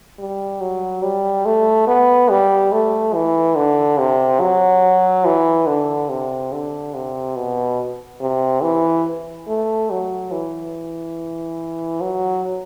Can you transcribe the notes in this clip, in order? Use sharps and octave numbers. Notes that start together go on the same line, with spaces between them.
G3
F#3
G3
A3
B3
G3
A3
E3
D3
C3
F#3
E3
D3
C3
D3
C3
B2
C3
E3
A3
F#3
E3
F#3